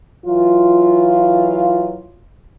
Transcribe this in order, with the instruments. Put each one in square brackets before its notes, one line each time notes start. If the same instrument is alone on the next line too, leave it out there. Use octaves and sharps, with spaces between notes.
[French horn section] E3 F#3 F4